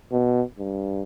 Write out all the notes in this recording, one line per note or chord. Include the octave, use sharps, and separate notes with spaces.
B2
G2